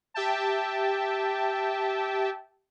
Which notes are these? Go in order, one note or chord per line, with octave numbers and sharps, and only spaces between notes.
G4 E5 G5 A5